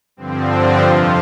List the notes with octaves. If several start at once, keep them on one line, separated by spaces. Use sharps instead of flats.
G2 D3 F3 C4
D4
F2 C3 F3 F4